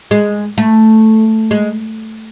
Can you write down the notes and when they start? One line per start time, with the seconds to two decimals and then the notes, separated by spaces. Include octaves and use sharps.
0.11 G#3
0.58 A3
1.51 G#3